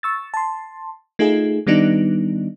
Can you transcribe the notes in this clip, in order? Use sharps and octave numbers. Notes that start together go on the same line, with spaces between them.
C#6 E6 A6
A5 C6
A3 D#4 F4 G#4
D#3 G3 B3 D4 D#4